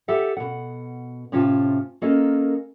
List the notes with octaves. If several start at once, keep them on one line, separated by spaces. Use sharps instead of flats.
G4 A4 E5 F#5
B2 F#5
A2 C3 C#4 F4 A5
A#3 C#4 A4 A#4 D#5